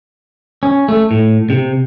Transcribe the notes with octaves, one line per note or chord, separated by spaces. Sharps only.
C#4
A3
A2
C3